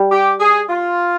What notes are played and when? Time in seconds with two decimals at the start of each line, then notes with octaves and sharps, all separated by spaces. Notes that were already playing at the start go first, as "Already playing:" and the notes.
Already playing: G3
0.11 G4
0.40 G#4
0.69 F4